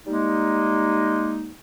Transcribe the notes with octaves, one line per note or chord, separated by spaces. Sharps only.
G3 G#3 A#3 D#4